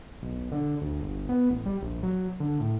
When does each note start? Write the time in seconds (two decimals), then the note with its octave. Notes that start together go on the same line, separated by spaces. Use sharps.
0.22 B1
0.52 D3
0.82 D2
1.01 G1
1.29 B3
1.50 A1
1.66 G3
1.82 A#1
2.03 F#3
2.40 D3
2.60 A2